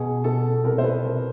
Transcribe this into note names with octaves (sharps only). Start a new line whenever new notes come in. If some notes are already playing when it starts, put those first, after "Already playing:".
Already playing: B2 G#4
B2 A4
C2 A#4
C5
B4
C2 A#4